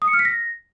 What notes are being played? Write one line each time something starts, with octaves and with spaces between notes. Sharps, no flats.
D#6
C#7
F6
B6
A#6